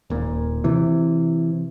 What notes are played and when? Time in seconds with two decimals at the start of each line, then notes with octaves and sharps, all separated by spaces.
0.10 D#1 A#2
0.64 C3 E3